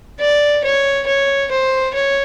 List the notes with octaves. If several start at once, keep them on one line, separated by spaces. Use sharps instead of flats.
D5
C#5
C#5
C5
C#5